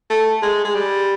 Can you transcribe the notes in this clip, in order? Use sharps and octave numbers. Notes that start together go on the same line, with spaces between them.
A3
G#3
G#3
G3